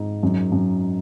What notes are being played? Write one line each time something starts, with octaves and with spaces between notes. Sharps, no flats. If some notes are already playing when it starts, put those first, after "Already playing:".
Already playing: G#2
F#2
F#2